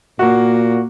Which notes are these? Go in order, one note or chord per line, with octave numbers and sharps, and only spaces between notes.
A#2 A#3 F#4